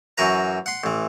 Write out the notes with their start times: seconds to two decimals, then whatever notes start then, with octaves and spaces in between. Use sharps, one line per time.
0.18 F#2 E3 F#4 B4 A#5
0.66 F#5 C6
0.84 A1 E3